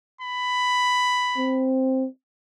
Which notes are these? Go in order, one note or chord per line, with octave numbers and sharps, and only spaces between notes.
B5
C4